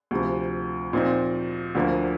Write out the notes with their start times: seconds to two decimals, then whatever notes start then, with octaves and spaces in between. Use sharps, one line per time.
0.11 D2 C3 F3
0.93 A#2 F3 C4 D#4
1.75 D2 D3 F3 A#3